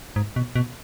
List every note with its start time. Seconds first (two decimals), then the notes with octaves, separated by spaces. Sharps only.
0.16 G#2
0.36 B2
0.56 B2